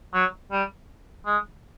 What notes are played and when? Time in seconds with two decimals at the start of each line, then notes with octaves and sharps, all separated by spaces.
0.14 F#3
0.51 G3
1.26 G#3